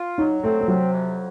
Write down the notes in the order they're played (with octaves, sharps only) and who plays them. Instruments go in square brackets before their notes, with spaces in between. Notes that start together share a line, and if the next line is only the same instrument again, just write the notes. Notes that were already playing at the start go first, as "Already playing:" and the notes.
Already playing: [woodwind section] F4
[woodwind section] F#3 [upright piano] D#4
[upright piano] A3 [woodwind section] C4
[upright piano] A3
[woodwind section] C3 [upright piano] F#3
[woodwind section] F2